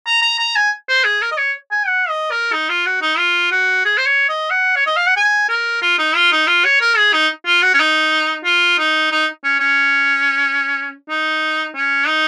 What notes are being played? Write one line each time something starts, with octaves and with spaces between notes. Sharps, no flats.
A#5
A#5
A#5
G#5
C5
G#4
A#4
D#5
C#5
G#5
F#5
D#5
A#4
D#4
F4
F#4
D#4
F4
F#4
G#4
C5
C#5
D#5
F#5
C#5
D#5
F5
F#5
G#5
A#4
F4
D#4
F4
D#4
F4
C#5
A#4
G#4
D#4
F4
F#4
C#4
D#4
F4
D#4
D#4
C#4
C#4
D#4
C#4
D#4